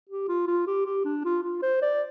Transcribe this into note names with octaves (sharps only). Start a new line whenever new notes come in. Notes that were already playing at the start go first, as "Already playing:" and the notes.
G4
F4
F4
G4
G4
D4
F4
F4
C5
D5